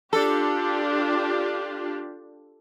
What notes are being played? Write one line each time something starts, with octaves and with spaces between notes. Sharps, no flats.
D4 F4 G4 A4